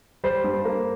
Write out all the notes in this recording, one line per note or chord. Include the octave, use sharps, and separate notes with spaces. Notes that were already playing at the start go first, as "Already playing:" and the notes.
G3 C5
G2
A#3